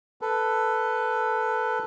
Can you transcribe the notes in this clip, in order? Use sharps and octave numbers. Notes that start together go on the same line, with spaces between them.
A4 B4